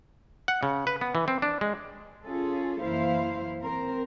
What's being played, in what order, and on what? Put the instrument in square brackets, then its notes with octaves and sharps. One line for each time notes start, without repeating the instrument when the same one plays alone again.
[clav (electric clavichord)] F#5
C#3
B4
B3
E3
C4
D4
G#3
[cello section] C#4 F4 G#4 A4
F#2 E3 A#3 E4 C5 F5
C4 A#4 C5